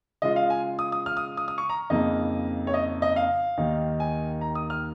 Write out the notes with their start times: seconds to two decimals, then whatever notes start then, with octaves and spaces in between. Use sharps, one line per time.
0.22 C#3 G#3 F4 D#5
0.36 F5
0.50 G#5
0.79 D#6
0.92 D#6
1.06 F6
1.17 D#6
1.37 D#6
1.48 D#6
1.58 C#6
1.69 A#5
1.90 F2 C#3 A#3 D#4 D#5
2.67 C#5
2.74 D#5
3.02 D#5
3.16 F5
3.58 D#2 D#3 A#3 D#4
4.00 G#5
4.41 A#5
4.55 D#6
4.70 F6